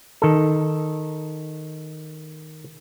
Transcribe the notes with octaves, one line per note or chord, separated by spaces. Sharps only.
D#3 A4